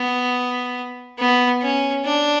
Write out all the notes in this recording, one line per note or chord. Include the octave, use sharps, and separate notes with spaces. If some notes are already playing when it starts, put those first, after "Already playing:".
Already playing: B3
B3
C#4
D4